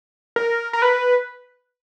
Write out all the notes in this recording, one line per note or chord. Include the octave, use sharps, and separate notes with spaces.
A#4
A#4
B4